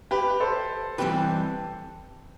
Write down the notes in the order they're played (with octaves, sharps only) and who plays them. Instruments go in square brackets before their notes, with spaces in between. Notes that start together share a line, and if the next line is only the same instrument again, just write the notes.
[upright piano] G4 B4
A4 C5
[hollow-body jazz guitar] E3 G3 C4 G4 B4